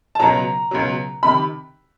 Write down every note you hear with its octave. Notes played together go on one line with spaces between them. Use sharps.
A5
C#2 B2 F#3 A#5
C#2 B2 F#3
C3 D#3 B5